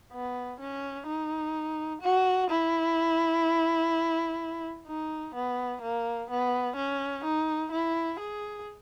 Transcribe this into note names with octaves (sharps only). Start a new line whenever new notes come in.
B3
C#4
D#4
F#4
E4
D#4
B3
A#3
B3
C#4
D#4
E4
G#4